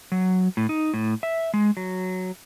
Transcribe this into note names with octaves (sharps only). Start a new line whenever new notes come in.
F#3
A2
D#4
A2
E5
G#3
F#3